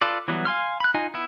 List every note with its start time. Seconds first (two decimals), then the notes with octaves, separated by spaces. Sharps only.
0.01 F4 A4 B4 D5
0.28 E3 F#3 G3 B3 E4
0.45 F5 G#5 C6 F6
0.80 B5 F#6
0.94 D#4 F4 D#5 G#5
1.14 B3 E4